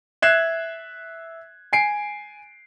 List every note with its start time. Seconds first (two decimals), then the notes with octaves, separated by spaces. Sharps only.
0.22 E5 F#6 G#6 C7 E7
1.73 G#5 C7 D7